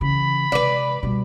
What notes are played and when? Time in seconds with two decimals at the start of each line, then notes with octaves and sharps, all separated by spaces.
0.01 C#3 E3 B5
0.52 C3 G#3 B4 D5
1.03 B2 G3